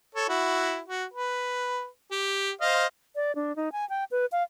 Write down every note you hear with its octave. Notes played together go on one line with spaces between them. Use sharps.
A4 C#5
E4 F#4
F#4
B4
G4
C5 D#5 F5
D5
D4
D#4
G#5
G5
B4
F5